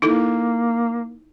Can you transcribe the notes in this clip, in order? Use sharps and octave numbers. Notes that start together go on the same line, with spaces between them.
A#3 D#4 E4 A4